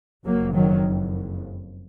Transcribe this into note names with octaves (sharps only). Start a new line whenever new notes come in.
F#1 F2 F#3 A#3
D#3 F#3